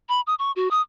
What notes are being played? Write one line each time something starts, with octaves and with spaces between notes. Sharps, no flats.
B5
D#6
C#6
F#4
D#6